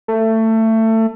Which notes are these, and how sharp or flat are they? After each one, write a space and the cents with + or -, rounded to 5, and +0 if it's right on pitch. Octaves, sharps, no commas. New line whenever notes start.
A3 +20